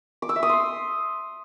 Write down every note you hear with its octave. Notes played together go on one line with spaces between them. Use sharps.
D6
E6
E5
D#6
C6